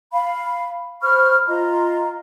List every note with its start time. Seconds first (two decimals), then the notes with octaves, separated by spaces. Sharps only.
0.12 F5 B5
1.02 C5 B5 C#6 F6
1.48 F4 D#5 A#5 C6